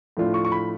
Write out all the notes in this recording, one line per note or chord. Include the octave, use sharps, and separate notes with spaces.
A2 F3 A3 D4 F4
C#6
C#6
B5